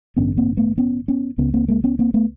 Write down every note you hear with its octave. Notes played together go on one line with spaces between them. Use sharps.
A1 G2 D3 B3 C#4
A#3 C4
A3 B3
B3 C#4
B3 C#4
C#2 C#3 B3 C#4
A#3 C4
G#3 A#3
B3 C#4
A#3 C4
A3 B3